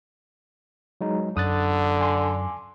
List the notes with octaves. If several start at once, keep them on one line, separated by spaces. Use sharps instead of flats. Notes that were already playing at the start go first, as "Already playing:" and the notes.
F#3 G#3 D#4
F#2 D3 D#6 F#6 A6
G#5 C6 D6